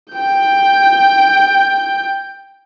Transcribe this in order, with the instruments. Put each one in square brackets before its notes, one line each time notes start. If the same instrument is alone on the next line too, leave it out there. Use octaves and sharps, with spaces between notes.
[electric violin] G5 G6